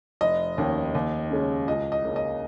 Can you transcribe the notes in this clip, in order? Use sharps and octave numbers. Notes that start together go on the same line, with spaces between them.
F1 D#5
D#2 D#3 C#4
D#2
C#3 G#3 C#4
C#2 D#5
D#5
C#3 A#3 C#4
D#5